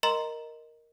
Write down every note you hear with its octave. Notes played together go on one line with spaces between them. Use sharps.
A#4 D#5 A#5 C6